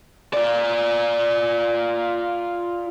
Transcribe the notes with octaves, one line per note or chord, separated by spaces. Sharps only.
F4 D5